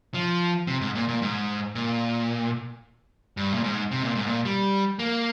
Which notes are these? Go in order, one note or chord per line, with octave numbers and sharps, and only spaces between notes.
F3
C3
G#2
A#2
A#2
G#2
A#2
G2
A#2
G#2
C3
A#2
G#2
A#2
G3
A#3